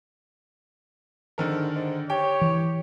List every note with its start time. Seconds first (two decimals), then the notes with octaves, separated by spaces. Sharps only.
1.38 G#2 D3 D#3 A#4
1.75 G#2
2.10 G4 C#5 G5
2.41 E3